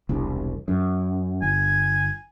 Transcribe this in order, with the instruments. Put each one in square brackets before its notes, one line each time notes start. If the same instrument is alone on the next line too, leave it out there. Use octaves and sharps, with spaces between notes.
[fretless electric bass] E1 C2
F#2
[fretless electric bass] G1 [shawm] G#5